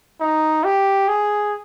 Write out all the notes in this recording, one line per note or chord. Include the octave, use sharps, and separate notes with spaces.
D#4
G4
G#4